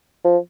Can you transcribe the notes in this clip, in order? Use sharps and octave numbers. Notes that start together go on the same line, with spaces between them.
F3